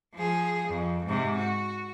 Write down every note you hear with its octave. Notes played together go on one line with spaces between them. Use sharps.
F3 G#4
F2
G#2 C3
F#4